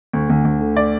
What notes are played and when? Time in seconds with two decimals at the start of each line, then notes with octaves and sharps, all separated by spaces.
0.13 D2
0.30 D2
0.45 D2
0.61 D3
0.77 D5